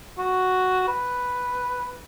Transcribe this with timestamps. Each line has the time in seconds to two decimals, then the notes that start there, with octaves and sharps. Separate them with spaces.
0.18 F#4
0.88 B4